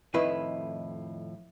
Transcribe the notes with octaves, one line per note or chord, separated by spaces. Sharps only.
F2 A2 D#3 E4 B4 D#5